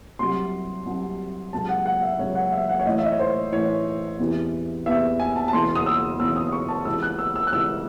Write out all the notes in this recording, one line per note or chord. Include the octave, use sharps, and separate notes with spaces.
C2 C3 F#3 C6
C2 C3 F#3
C#2 C3 F#3 A5
F#5
F#5
E5
C#2 C3 F#3 C#5
F#5
E5
F#5
C#5
A1 A2 E3 D#5
E5
D#5
C#5
C5
A1 A2 E3 C#5
E2 C3 E3
E2 C3 E3 E5
G#5
A5
A5
E1 E2 C#3 E3 C6
D#6
E6
E1 E2 C#3 E3 E6
D#6
C#6
A5
C#2 C3 E3 E6
F#6
E6
E6
F#6
C#2 C3 E3 E6